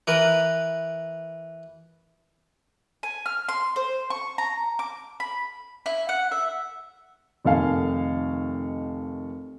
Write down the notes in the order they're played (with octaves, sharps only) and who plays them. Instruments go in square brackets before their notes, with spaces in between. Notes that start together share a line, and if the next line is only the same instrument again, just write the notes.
[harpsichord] E3 A#4 B4
[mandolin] G#5
F6
C6
C5
C#6
A#5
D6
B5
E4
F#5
E5
[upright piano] F1 D#3 A4 F5 G#5